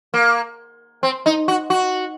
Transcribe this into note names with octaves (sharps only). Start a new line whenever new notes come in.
A#3
C4
D#4
F#4
F#4